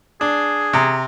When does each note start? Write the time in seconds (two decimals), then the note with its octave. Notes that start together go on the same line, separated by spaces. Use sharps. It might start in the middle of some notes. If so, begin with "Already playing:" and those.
0.21 D4 G#4
0.73 C3 A#5